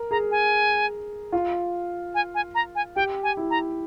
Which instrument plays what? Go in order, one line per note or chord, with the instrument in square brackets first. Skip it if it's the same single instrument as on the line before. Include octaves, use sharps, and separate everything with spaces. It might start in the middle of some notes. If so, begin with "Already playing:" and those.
Already playing: [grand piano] A#4
[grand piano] G#4 [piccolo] A#5
[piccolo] G#5
[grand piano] F4
[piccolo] G#5
G#5
A#5
G#5
[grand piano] G4 [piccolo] G5
[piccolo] G#5
[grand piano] E4
[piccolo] A#5